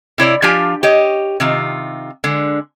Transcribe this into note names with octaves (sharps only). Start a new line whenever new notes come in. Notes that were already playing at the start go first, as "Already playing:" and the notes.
C3 E4 C#5 D5
F3 D4 F4 G4 G#5
G4 C#5 D#5
C3 D#3 F4
D3 G#3